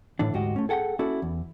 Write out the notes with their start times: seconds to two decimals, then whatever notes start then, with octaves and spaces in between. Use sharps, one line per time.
0.19 A2 D3 E3 D4
0.34 D2 G#2 F#4 G4 D#5
0.56 A3 C#4
0.69 G#4 A4 F#5 G5
0.99 A#3 C#4 E4 F#4 A4 D5
1.22 E2